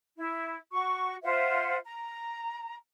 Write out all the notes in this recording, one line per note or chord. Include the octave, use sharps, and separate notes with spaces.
E4
F#4 C#6
F4 C5 E5 F#5
A#5